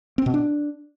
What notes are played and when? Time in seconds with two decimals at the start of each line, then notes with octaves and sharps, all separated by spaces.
0.18 C4
0.26 B2
0.34 D4